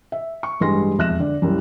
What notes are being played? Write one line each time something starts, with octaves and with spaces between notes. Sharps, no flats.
E5
C#6
A1 G2 G3 G#3 C6 A#6
E1 F2 E5 F#6 A#6 E7
D3 D5
C2 F#2 G3